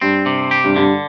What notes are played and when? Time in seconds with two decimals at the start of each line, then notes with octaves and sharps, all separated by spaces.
0.02 G2 C4
0.26 C3
0.51 G4
0.64 G2
0.76 G2 D3